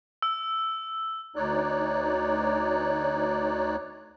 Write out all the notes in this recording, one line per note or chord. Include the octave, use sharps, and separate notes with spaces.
E6
D2 D#4 C#5 D5 F#6